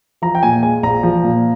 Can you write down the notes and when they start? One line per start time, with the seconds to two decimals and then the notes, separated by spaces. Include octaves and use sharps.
0.22 F3 A#5
0.35 G5
0.43 A#2 G#5
0.63 G#3 G#5
0.83 A#1 A#5
1.03 F3
1.23 A#2